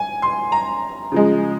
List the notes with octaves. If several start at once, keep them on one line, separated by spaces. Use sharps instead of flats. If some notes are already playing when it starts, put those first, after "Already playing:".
Already playing: G#5
C6
A#5
C#3 F3 G#3